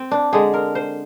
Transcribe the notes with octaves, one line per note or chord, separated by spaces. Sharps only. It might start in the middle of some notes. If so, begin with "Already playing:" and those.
Already playing: C4
D4
D3 G#3 G#4
A#4
C5